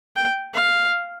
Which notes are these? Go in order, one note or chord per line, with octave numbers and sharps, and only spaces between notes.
G5
F5